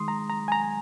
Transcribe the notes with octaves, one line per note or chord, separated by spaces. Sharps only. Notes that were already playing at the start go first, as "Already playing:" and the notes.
Already playing: D#3 G#3 C6 D#6
A#5
A#5
G#5
A#5